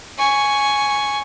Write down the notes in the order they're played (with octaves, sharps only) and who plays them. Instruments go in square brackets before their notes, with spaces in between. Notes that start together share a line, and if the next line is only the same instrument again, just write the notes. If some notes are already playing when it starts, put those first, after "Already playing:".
[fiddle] G#5 C#6